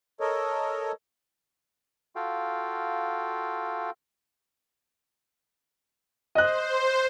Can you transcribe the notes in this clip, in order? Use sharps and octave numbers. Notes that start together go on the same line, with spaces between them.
A4 A#4 C#5 D#5
F4 F#4 A4 F5 G5
C5 D#5 F#6